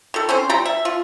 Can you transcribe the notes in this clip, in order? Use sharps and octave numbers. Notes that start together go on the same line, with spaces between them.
D#3 A4
C4 C#4 C5
G3 G5 A#5
E5
F4